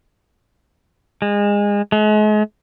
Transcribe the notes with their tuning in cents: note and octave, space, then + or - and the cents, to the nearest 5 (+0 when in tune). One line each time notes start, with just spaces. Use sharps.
G#3 -25
G#3 +40